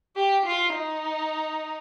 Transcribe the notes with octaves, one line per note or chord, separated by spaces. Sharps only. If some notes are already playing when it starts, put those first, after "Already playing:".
G4
F4
D#4